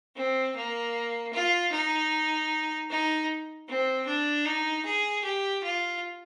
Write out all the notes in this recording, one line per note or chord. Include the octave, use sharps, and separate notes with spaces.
C4
A#3
F4
D#4
D#4
C4
D4
D#4
G#4
G4
F4